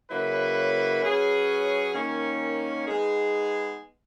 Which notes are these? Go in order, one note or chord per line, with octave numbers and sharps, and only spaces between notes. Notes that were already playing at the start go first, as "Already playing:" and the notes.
C#3 F#3 A#3 E4 B4
F#3 C#4 G#4 B4
D#3 A#3 C#4
G#3 B3 D#4 G#4